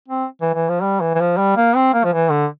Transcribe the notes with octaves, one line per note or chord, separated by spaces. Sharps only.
C4
E3
E3
F3
G3
E3
E3
F3
G3
A#3
C4
A#3
F3
E3
D3